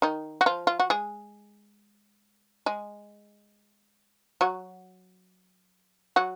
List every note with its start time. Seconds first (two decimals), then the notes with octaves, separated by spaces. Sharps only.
0.02 D#3 D#4
0.41 F#4
0.46 F3 F4
0.67 F4
0.80 F#4
0.90 G#3 G#4
2.66 G#3 G#4
4.41 F#3 F#4
6.16 F#3 F#4